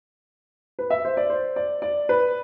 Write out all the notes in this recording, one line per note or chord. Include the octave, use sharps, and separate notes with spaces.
B4
E5
C5
D5
C5
D5
D5
B4